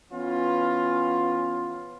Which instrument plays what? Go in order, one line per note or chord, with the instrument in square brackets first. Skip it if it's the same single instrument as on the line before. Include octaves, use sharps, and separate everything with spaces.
[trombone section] E3 B3 C#4 F4